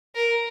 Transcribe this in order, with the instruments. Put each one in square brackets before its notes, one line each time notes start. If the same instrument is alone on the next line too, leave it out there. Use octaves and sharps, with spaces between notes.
[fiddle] A#4